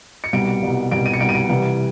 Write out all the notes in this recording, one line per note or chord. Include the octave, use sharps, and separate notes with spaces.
C#7
C2 B2 G3 D7
C2 B2 G3
C2 B2 G3 D7
D#7
C#7
C2 B2 G3 D7
D#7
D7
C2 C3 E3 G3